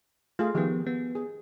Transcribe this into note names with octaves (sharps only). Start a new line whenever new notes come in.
A3 F4 G#4
D#3 F3 B3 G4 G#4
B3
G#4